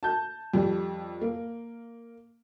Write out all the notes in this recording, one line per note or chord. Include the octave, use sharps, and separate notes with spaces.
A5 G6
F2 G3
A#3